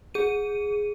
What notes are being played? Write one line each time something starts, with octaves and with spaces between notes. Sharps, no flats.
G#4 D#7